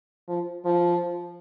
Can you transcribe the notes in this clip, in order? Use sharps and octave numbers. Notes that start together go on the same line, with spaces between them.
F3
F3